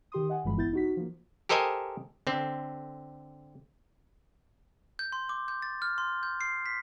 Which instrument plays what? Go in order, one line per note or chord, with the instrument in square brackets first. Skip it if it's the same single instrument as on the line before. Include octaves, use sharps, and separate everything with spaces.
[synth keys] D#3 G4 C6 D#6
D#5 F#5 G#5
G1 G2 E3 F3 G#3 B5
A#1 B3 E4 G6 A6
D#4 F#4 B6
F3 A#3
[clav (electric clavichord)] G4 A4 A#4 C5 D#5 G#5
D3 C4
[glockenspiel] G6
C6
D6
G6
A6
F6
C6
G6
C7
B6